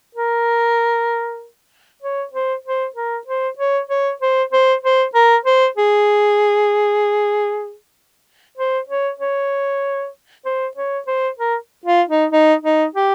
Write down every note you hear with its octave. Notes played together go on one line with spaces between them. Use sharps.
A#4
C#5
C5
C5
A#4
C5
C#5
C#5
C5
C5
C5
A#4
C5
G#4
C5
C#5
C#5
C5
C#5
C5
A#4
F4
D#4
D#4
D#4
G4